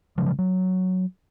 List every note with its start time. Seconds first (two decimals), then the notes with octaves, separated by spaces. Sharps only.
0.18 C#3 F3 F#3 G#3
0.39 F#3